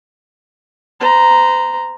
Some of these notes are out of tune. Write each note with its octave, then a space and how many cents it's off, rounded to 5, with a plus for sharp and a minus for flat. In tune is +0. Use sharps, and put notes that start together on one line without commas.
C5 -35 A#5 +0